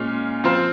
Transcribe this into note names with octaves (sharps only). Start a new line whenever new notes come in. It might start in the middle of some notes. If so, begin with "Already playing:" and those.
Already playing: A#2 G#3 C#4 F4
F3 C4 F4 C5